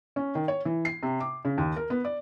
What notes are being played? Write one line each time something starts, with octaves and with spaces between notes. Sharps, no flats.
C#4
D#3
C#5
E3
C7
C3
D6
C#3
D#2
A#4
B3
D5